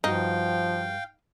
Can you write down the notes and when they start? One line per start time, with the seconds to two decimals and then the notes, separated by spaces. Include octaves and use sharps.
0.04 G2 F3 D#4 F#4 F5 G5